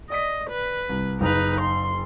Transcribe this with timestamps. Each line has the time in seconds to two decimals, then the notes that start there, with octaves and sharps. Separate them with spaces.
0.10 D5 D#5 A#6 B6
0.50 B4
0.89 C2
1.21 F#1 D#4 B4 F7
1.61 C6